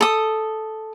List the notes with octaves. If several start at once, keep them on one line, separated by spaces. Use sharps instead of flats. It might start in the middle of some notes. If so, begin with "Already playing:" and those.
A4 D#6